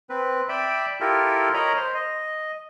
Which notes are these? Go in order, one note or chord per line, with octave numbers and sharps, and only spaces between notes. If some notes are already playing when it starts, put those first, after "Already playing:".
C4 B4
D5 E5 G5 B5
E4 F4 G4 A4 A#4
A#4 C#5 D#5 A#5 B5
C5
D#5